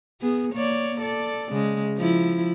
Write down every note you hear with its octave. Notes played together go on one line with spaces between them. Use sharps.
B3 G#4
A#3 C#5 D5
A4 D5
C#3 G#3
F3 E4